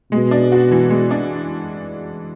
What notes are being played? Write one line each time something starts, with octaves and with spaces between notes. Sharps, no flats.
B2 G#3
D4
F#4
E3
G#3
D4